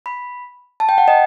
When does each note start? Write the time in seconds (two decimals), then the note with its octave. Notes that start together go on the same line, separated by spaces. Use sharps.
0.06 B5
0.80 A5
0.89 G5
0.98 F#5
1.08 D#5